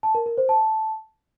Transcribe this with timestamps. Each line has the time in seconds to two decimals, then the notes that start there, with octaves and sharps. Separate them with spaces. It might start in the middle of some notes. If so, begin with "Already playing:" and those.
0.03 A5
0.15 A#4
0.26 A#4
0.37 C5
0.49 A5